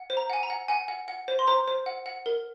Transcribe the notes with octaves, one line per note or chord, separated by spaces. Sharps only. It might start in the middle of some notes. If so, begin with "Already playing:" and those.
Already playing: F#5
C5
A#5
F#5 G#5
A#5
F#5
F#5 G#5
F#5
F#5
C5
C6
C5 A#5
C5
F#5
F#5
A#4